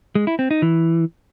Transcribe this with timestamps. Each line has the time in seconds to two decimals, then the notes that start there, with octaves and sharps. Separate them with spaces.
0.15 G#3
0.27 E4
0.39 C4
0.51 D#4
0.62 E3